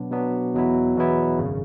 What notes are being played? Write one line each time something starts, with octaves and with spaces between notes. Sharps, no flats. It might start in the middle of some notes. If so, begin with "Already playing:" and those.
Already playing: B2 F#3 B3 D4
B2 F#3 B3 D4
E2 B2 F#3 B3 E4
E2 B2 F#3 B3 E4
G#1 F#2 C#3